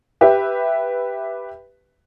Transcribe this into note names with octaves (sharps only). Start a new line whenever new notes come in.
G4 B4 E5